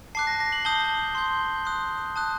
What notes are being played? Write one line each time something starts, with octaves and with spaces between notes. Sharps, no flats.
A5 D6 F#6 C7
A#6
A#6
F#7
A5 D#6 G6 G7
C6 G6
C6 D#6 F#6
A5 D#6 F#6